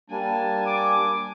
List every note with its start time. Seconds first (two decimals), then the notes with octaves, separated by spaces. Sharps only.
0.10 G3 A#3 D4 G#5 A5
0.66 D6